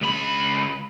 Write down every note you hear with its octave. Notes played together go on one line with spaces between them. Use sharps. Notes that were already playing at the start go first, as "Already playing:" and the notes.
C#2 B5